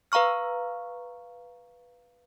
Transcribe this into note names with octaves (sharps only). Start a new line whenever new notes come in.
B4 F5 A#5 C#6 F6